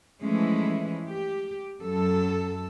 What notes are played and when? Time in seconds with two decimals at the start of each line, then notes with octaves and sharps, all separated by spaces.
0.22 E3 F3 G#3 A3 C#4 E4
1.09 G4
1.80 F#2 F#3 A4